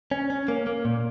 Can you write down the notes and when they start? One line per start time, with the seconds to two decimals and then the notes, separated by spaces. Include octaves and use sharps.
0.11 C#4
0.30 C#4
0.48 A#3
0.67 A#3
0.85 A#2